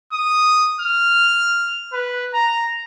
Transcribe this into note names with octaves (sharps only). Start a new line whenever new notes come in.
D#6
F6
B4
A#5